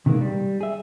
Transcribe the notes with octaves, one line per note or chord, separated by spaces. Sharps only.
C3 D#3 E3 G#3 A#3
G3
G#4 E5